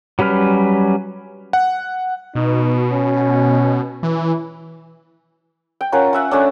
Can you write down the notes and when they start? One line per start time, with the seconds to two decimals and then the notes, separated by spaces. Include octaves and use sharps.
0.19 F#3 G3 C#4 B4 F6
1.53 F#5
2.35 B2 D#4
2.91 C#4
4.03 E3
5.81 G5
5.92 C#4 F4 A#4 F#5
6.13 F4 E5 F#5
6.31 A3 C#4 D4